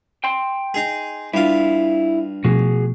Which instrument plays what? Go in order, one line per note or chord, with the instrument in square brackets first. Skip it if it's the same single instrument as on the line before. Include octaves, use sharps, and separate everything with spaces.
[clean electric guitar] G5 C6
[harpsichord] D#4 G#4
[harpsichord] G2 F4 [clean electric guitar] E4
[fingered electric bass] B2 F3 A3 [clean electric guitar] F#4 G#4